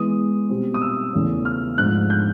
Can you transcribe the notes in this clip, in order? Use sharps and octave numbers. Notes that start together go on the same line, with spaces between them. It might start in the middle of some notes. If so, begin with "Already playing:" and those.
Already playing: E3 G#3 B3 D#6
B2 G3 C4
D#6
E6
E2 C#3 E3 A3 C#4
F6
G#2 F3 A3 D4 F#6
G6